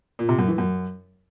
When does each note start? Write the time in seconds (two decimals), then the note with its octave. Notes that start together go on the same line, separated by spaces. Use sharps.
0.19 A#2
0.29 C3
0.39 F#2
0.48 E3
0.58 F#2